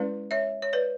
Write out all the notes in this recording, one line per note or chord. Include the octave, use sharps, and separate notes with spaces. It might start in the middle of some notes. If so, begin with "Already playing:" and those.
Already playing: G#3 C#4 E4 B4 D5
C#5 E5
C#5
B4 D5